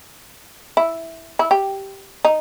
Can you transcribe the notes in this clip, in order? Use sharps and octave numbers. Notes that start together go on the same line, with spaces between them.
E4
E4
G4
D#4